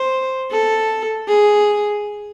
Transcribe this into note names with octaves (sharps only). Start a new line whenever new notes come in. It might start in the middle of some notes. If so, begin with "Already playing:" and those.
Already playing: C5
A4
G#4